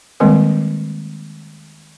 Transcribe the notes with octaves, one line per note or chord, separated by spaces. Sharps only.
D#3 G3 G#3 A#3 C4 A#4